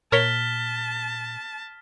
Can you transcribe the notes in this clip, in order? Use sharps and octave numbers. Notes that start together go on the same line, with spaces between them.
A#2 A#4 C#5 A5 F6 B6 G7